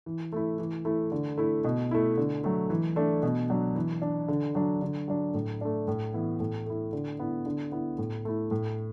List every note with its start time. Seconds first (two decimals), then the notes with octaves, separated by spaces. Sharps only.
0.06 E3
0.32 A3 E4
0.58 E3
0.85 A3 E4
1.12 D3
1.38 A3 E4
1.64 B2
1.91 A3 E4
2.17 D3
2.44 F#3 A3
2.70 E3
2.96 A3 D4
3.23 B2
3.50 F#3 D4
3.76 E3
4.02 D4
4.28 D3
4.55 F#3 D4
4.82 D3
5.08 F#3 D4
5.34 A2
5.61 A3 D4
5.88 A2
6.14 E3 B3 E4
6.40 A2
6.66 A3 E4
6.93 D3
7.19 B3 E4
7.46 D3
7.72 B3 E4
7.98 A2
8.25 A3 E4
8.51 A2